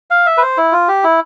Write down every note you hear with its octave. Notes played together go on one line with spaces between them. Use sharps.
F5
E5
B4
C5
E4
F4
G4
E4